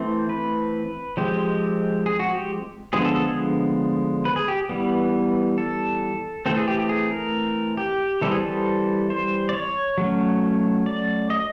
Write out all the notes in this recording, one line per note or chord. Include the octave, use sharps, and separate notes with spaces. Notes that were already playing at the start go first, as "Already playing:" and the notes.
Already playing: E3 A3 C4 C5
B4
F3 G#3 C4 G4
G#4
F#4
G4
D3 F3 G#3 B3 G#4
A4
A4
G#4
B4
G#4
G4
E3 G3 B3
A4
E3 A3 C4 A4
G#4
G4
G4
G#4
A#4
G4
E3 G3 C4 A4
G#4
A4
C5
D5
C#5
F#3 A3 C#4
D5
D#5